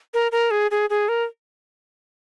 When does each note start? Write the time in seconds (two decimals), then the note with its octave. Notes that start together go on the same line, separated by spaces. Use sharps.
0.14 A#4
0.32 A#4
0.51 G#4
0.71 G#4
0.90 G#4
1.09 A#4